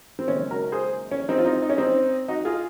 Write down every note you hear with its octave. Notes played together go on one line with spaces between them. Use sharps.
C4
F#1 F#2 D#3 G#3 C#4
F#4 A#4
G#4 C5
C#4
C4 D#4
F4
C4 D#4
D#4
C#4
C4 D#4
D#4 F#4
F4 G#4